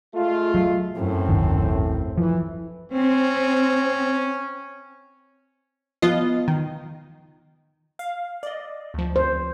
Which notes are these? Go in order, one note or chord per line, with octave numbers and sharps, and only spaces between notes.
G#3 A3 F4
F#3
F#2 A2 C4
D#1 G#1 D#3
E3 F3
C4 C#4
F3 B3 F4 D#5
D#3
F5
D5 D#5
D2 F3
C5